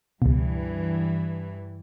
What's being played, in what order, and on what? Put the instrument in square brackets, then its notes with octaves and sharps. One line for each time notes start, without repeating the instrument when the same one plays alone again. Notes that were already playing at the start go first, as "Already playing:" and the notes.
[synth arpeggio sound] C#2 B2 [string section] G2 E3